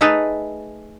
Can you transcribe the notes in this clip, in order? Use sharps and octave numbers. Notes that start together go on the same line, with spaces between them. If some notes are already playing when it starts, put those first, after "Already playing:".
A3 D#4 G#4 A4 B4